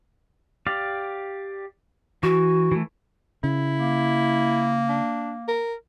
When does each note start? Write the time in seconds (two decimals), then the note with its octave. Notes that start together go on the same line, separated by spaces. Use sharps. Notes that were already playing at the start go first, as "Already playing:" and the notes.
0.67 G4 D5 F5
2.23 E3 F#4
2.72 E3 A3
3.44 C#3 E4
3.76 A#3
4.89 D4
5.48 A#4